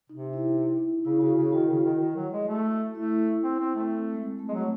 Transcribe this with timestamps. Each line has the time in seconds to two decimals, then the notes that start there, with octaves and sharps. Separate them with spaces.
0.10 C3 D#4
0.33 E4
1.05 C#3 E4
1.21 C#3 F#4
1.36 C#3 E4
1.53 D#3 F#4
1.68 C#3
1.84 D#3
2.01 D#3
2.16 F#3
2.33 G#3
2.48 A3
2.95 A3 E4
3.43 C4
3.59 C4
3.75 A3
3.91 C4
4.14 G#3
4.39 A3
4.48 G#3
4.54 F#3 A3